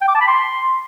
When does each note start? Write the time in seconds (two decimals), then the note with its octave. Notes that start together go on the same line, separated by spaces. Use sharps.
0.02 G5
0.08 D6
0.15 A5
0.21 B5
0.28 C6